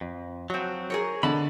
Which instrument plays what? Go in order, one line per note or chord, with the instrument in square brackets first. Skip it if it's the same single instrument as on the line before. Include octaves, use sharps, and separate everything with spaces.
[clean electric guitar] F2
[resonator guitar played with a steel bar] F3 F#4 [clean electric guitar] F#3 C4
[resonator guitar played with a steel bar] G#4 A#4 C#5
[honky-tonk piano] D3 [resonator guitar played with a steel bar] D#5 A5 [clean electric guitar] B5